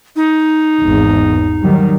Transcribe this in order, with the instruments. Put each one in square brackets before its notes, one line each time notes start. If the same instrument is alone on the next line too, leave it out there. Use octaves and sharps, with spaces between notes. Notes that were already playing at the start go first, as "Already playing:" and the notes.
[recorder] D#4
[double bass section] G#1 E2
D#3 F#3 G3